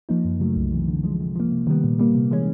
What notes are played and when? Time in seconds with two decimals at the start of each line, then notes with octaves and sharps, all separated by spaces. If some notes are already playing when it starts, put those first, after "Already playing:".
0.09 F3 A#3 D#4
0.25 F#2
0.40 C#3 F#3 A3
0.56 C2
0.72 C3 E3
0.88 D3
1.03 F3 G#3
1.20 C3
1.36 F3 A#3
1.51 C3
1.67 D#3 G3 B3
1.84 A#2
1.99 G3 A#3
2.15 C3
2.31 E3 G#3 C#4